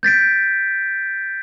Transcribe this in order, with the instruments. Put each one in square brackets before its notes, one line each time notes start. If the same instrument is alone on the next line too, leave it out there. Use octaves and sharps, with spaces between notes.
[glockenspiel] G6 A6 B6 D7